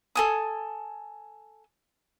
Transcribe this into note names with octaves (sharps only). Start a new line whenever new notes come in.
A4 G#5 D#6